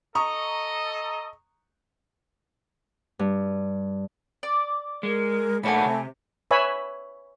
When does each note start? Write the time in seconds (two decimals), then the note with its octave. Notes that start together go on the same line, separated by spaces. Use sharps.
0.15 A4 D#5 A#5 C#6 D#6
3.19 G2
4.43 D5
5.03 G#3 A#4
5.63 A#2 A3 C#5 F#5 G#5 A5 B5
5.85 C3 C4
6.51 B4 C#5 E5 G#5 B5